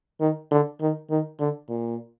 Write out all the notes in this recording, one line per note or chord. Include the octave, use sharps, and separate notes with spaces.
D#3
D3
D#3
D#3
D3
A#2